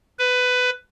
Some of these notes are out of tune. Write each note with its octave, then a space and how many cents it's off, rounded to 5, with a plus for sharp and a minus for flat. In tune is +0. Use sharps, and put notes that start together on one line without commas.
B4 +15